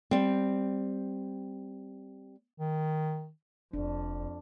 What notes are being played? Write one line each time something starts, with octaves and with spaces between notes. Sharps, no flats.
G3 C4
D#3
F1 F2 D4